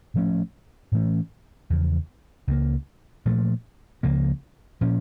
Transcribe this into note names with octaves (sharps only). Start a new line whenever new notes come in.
A2 F3 A3 C#4
A2 E3 A3 C#4
E2 C#3 F3
C#2 C#3 G3 A#3
A#2 F3 A3
C#2 C#3 F3 A#3
A#2 F3 C#4